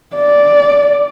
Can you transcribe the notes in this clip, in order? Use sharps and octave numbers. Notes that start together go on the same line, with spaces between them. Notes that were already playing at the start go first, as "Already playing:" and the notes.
D5